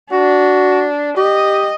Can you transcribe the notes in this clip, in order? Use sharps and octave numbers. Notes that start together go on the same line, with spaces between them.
D4 F#4
G4 D#5